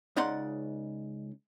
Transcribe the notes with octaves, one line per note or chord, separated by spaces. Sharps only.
C#2 C#3 D#4 D5 F#5 C6